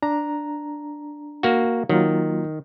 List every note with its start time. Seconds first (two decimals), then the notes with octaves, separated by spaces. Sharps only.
0.02 D4 A#5
1.43 A#3 F#4
1.89 D#3 F#3 A#3 F4